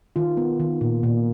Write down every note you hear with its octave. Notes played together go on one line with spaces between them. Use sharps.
D#3 F4
B3
D#3
A#2
A#2